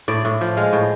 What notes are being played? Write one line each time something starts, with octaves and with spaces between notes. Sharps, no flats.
A2 D5
A2
F3
G#3 F5
A2